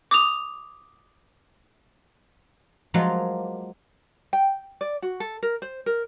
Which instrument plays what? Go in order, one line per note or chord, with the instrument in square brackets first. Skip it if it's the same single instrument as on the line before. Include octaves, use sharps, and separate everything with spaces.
[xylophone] D6 D#6 F7
[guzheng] F3 F#3 G#3 A#3 F4
[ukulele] G5
D5
F#4
A4
A#4
C5
A#4